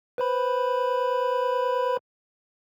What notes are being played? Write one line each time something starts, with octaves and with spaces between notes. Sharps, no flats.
B4 C5 B5